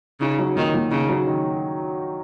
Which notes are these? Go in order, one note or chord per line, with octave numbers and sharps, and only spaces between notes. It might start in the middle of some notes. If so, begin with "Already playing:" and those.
C#3 D#4
F#3
A#2 D#3
A#2
C#3 D#4
F#3
D#3